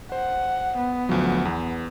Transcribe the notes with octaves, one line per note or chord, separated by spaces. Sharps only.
C5 F#5
B3
D2 F3 F#3
E2